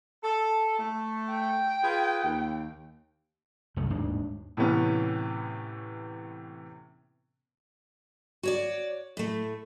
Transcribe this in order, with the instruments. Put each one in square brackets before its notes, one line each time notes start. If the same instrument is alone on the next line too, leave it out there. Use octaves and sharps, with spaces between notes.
[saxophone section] A4
A3
[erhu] G5
[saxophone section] F4 G#4 B4
D#2
[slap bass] C2 F#2 C3 A3
D#1 D2 G#2 D4
[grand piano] A2 C3 E3 B3 C#4
[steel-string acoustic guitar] F#4 C#5 D5
A2 A3